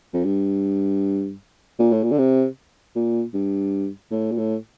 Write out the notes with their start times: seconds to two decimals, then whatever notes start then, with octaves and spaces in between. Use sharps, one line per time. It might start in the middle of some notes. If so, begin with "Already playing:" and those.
0.13 F2
0.25 G2
1.79 A#2
1.92 A2
2.03 A#2
2.12 D3
2.18 C3
2.96 A#2
3.34 G2
4.11 A2
4.31 A#2
4.38 A2